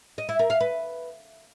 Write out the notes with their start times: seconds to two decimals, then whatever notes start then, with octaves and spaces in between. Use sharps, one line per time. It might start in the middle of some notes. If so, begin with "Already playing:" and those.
0.18 D#5
0.29 E4
0.39 A#4
0.50 F5
0.60 B4